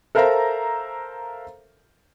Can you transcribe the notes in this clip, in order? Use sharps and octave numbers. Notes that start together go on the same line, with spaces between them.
A4 A#4 C5 E5 F5 A#5